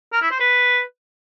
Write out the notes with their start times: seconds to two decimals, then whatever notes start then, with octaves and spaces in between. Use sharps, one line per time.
0.13 A#4
0.22 E4
0.31 C5
0.40 B4